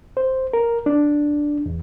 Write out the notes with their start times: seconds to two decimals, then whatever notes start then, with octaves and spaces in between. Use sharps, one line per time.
0.17 C5
0.53 A#4
0.86 D4
1.66 E2